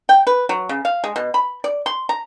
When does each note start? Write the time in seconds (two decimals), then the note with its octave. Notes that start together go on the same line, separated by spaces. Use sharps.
0.09 G5
0.27 B4
0.49 F#3
0.69 C#3
0.85 F5
1.04 G#3
1.16 B2
1.34 B5
1.64 D5
1.86 C6
2.09 A#5